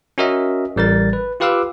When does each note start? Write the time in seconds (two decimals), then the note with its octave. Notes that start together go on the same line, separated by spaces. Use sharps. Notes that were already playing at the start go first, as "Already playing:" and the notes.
0.18 C#4 F#4 A#4 D#5 E5
0.76 A1 G3 A#4 A6
1.13 B4
1.40 F4 G4 B4 F5 D6 E6